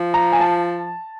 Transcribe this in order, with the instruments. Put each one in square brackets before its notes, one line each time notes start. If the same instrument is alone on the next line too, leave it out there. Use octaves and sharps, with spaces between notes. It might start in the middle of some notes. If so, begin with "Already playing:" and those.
Already playing: [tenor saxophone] F3
[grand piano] A#5
G#5
A5